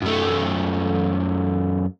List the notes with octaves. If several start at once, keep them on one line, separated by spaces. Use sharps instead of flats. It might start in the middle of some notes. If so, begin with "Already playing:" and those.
F#2 A3